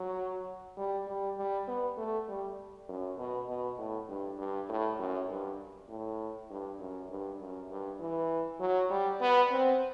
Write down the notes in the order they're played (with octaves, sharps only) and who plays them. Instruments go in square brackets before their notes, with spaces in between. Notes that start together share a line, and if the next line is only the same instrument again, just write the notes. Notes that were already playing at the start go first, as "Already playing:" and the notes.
Already playing: [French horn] F#3
G3
G3
G3
B3
A3
G3
F#2
B2
B2
A2
G2
G2
A2
F#2
G2
A2
G2
F#2
G2
F#2
G2
E3
F#3
G3
B3
C4